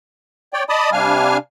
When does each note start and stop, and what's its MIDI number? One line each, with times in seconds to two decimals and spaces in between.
0.53 0.63 73
0.53 0.63 74
0.53 0.63 79
0.69 0.90 74
0.69 0.90 75
0.69 0.90 81
0.69 0.90 83
0.69 0.90 87
0.92 1.37 48
0.92 1.37 55
0.92 1.37 62
0.92 1.37 77
0.92 1.37 80
0.92 1.37 89